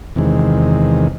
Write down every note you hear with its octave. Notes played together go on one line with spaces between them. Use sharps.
E2 C3 D#3 G#3